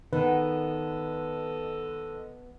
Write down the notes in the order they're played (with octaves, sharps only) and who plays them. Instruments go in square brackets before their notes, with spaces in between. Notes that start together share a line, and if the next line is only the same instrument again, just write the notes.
[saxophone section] D3 A4 D#5 [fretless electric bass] D#3 [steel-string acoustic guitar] B3 [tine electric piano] B4